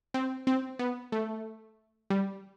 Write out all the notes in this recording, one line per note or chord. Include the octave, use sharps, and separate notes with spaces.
C4
C4
B3
A3
G3